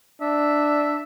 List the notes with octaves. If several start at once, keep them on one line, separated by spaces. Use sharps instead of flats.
D4 E5